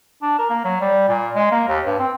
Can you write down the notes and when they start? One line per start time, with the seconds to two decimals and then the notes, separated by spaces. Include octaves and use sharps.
0.22 D4
0.39 A#4
0.50 A#3
0.64 F#3
0.81 G3
1.09 A#2
1.35 G#3
1.52 A#3
1.68 D#2
1.86 G2
1.99 C4